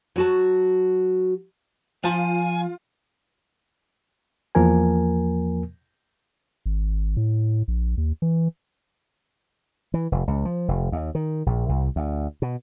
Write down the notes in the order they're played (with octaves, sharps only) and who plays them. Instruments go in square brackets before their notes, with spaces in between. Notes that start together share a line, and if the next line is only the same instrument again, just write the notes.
[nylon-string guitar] F#3 F#4 A5
[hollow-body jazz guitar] F3 A5 [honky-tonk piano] F4 [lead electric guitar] G#5
[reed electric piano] E2 F3 A#3 A#4 G#5
[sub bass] G#1
A2
A#1
D#2
E3
[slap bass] E3
F1
C#2
F3
F1
D#2
D#3
A#1
C2
D2
B2